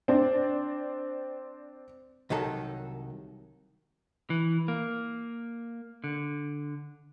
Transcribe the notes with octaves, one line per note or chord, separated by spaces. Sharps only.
C4 D4
C2 D#3 F#3 A4
E3
A#3
D3